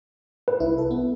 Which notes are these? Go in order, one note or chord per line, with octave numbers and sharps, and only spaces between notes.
B4
C2 E4
A4
B3